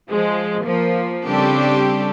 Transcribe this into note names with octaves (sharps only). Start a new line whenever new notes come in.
F3 G#3
F3 A#3
C#3 G3 C4 D4 G4 A4